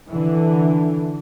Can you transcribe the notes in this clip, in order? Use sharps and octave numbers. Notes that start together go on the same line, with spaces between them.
D3 E3